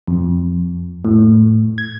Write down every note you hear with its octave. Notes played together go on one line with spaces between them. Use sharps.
F2
A2
G#6